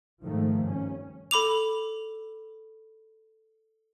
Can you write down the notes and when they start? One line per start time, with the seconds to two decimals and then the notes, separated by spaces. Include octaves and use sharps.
0.24 G#2 D#3 F3 A3
0.64 G2 C#4
1.31 A4 B5 D6 F7